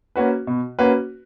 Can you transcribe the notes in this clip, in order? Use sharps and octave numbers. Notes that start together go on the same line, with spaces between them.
A#3 C#4 F#4 B4
B2
A#3 C#4 F#4 B4